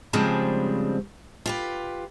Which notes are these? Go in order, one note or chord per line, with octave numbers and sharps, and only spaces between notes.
C#3 F3 G3 G#3 C4 D4
F4 G4 B4